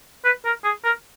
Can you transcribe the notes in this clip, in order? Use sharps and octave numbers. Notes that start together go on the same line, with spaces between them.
B4
A#4
G#4
A#4